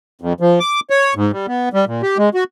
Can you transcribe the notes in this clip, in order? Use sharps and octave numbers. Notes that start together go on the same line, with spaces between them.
F2
F3
D6
C#5
G#2
G3
B3
G3
A#2
G4
G#3
F#4